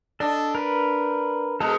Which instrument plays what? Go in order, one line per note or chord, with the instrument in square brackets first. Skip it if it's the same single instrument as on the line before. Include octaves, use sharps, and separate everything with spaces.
[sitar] D4 [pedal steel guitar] A4 D#5
[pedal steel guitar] A#4 B4
[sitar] B2 G#3 [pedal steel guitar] A4 A#4